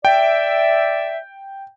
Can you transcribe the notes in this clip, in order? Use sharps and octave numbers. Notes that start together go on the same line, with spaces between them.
D5 E5 G5